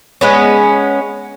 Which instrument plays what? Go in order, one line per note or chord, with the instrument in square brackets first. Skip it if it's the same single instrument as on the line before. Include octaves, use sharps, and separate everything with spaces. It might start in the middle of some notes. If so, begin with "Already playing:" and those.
[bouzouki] G#3 B3 C#4